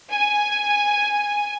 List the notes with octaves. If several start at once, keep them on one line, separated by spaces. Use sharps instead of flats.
G#5